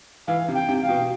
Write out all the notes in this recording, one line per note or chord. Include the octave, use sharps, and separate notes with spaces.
E3 F5
C3
G5
C3
F5
B2